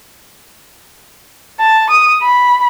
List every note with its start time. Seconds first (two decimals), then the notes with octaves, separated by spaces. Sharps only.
1.60 A5
1.90 D#6
2.23 B5